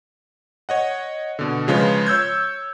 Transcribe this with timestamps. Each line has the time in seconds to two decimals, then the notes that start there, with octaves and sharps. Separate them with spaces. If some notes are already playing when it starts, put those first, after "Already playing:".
0.69 C#5 D#5 F#5
1.39 B2 D3
1.68 C#3 F3 G#3 F4 B4 C#5
2.07 C#5 E6 G6 G#6